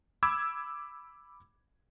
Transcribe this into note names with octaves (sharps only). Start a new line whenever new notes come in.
B5 D6 E6 G#6